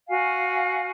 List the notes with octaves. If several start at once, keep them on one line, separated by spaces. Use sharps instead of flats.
F#4 F5 G#5